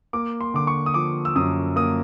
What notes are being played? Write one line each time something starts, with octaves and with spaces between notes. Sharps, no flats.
A#3 D6
C6
D3 D6
C#6
D#6
F3 D6
E6
F#2 D#6
A#3 D#6